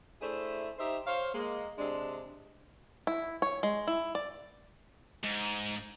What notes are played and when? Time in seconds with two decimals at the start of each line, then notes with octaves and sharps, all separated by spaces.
0.21 A3 D4 E4 G#4 C5
0.79 D#4 G4 C5 E5
1.07 C5 C#5 F5
1.34 G#3 A#3
1.78 C3 G#3 D4
3.07 E4
3.42 C#5
3.63 G#3
3.87 E4
4.15 D5
5.24 G#2